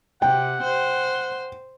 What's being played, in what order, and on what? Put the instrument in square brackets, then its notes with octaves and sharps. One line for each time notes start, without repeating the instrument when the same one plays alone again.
[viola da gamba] C3 [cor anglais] F#5 [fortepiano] G5
[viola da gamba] C5